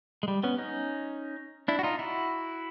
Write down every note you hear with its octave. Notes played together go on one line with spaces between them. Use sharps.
G#3
G3
B3 C#4
C#4 D#4
D4 E4
F#4
D#4 F4
E4 F#4